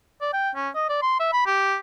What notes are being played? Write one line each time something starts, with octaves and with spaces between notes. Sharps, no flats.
D5
G5
C#4
D#5
D5
C6
E5
B5
G4